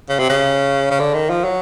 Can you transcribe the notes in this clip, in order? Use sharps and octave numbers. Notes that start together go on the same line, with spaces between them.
C#3
C3
C#3
C#3
D3
D#3
F3
F#3